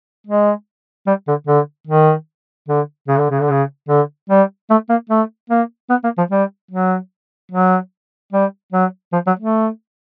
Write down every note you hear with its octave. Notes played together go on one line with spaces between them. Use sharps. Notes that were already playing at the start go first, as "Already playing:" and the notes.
G#3
G3
D3
D3
D#3
D3
C#3
D3
C#3
D3
C#3
D3
G3
A3
A#3
A3
A#3
B3
A#3
F3
G3
F#3
F#3
G3
F#3
F3
F#3
A3